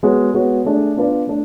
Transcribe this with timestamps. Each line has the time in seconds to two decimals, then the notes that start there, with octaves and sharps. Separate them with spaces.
0.03 G#3 B3 F#4 C#5
0.34 G#3 B3 F#4 C#5
0.65 A3 D4 G#4
0.96 B3 D4 F4 B4 D5
1.27 A3 D4